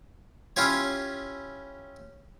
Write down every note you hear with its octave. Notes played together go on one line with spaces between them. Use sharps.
C#4 E4 F4 G4 C#5